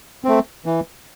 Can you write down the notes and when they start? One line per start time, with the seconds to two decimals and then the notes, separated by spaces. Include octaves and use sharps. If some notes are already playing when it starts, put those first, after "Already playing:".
0.25 A3 C4
0.66 E3